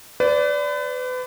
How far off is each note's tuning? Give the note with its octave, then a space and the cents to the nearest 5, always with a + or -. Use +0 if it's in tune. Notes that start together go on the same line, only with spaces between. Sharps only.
B4 +35 D5 -15